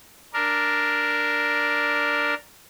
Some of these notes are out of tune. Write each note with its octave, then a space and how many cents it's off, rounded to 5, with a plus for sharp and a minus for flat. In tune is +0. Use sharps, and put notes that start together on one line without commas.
D4 +0 A#4 +0